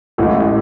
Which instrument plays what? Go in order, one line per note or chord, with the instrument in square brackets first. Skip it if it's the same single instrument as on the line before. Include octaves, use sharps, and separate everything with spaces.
[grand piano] A1 A2 G#3 A4